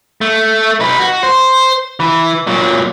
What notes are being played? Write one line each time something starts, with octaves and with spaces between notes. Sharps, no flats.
A3
D#4 B4
F#4
C5
E3
A#2 F#3